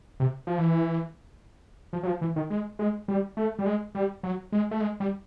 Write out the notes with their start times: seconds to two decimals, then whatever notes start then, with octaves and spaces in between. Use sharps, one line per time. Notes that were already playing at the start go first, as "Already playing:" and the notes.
0.20 C3
0.47 F3
0.58 E3
1.93 F3
2.03 F#3
2.07 F3
2.21 E3
2.36 D#3
2.50 G#3
2.79 G#3
3.08 G3
3.37 A3
3.59 G3
3.66 G#3
3.95 G3
4.23 F#3
4.52 G#3
4.71 A3
4.81 G#3
5.00 G3